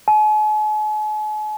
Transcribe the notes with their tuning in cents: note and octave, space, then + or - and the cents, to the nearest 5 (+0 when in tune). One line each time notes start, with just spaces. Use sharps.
G#5 +45